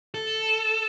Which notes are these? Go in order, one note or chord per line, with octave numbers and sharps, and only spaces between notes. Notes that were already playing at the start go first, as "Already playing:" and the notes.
A4